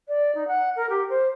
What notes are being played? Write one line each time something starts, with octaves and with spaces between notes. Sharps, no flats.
D5
D#4
F#5
A#4
G4
C5